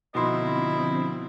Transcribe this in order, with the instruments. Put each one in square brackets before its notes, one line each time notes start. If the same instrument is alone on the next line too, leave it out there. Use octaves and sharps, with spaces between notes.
[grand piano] B2 D#4 C6 [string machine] D3 F3 C4 [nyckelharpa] E4 [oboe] D#5